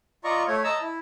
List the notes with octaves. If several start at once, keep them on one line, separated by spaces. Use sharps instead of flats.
F4 D5 D#5 A#5 C#6
A3 C#5
D#5 A5 A#5 E6
E4